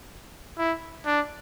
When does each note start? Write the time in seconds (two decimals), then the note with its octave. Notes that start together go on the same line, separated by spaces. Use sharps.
0.58 E4
1.06 D4